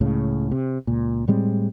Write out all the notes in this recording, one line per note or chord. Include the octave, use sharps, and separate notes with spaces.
C#2 A2 C#3
C3
C#2 A#2
A2 G3 G#3 C4